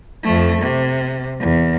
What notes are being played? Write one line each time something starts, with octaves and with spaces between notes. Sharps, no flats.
F2 A3
C3
E2